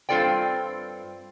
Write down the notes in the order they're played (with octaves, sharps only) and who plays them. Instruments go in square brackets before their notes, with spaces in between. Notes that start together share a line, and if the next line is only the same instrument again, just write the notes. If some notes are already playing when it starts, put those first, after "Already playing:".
[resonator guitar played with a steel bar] G2 C4 F4 A4 D5 G5